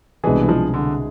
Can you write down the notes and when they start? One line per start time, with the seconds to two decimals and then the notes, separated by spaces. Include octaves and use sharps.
0.24 C2 B2 E3 G#3 D4 G#4
0.43 E3
0.49 F3
0.74 D3